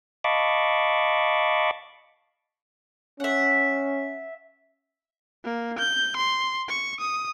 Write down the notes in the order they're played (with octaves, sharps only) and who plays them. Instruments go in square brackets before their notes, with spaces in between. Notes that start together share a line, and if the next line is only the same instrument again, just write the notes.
[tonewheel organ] D#5 F5 A5 B5 C#6 D6
[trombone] C#4 [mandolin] E5 F#5
[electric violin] A#3
G6
C6
C#6
D#6